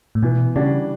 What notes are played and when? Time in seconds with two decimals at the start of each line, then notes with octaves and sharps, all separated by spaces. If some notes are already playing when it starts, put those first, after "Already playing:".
0.15 A2
0.23 B2 E3
0.56 C#3 G3 D4 F#4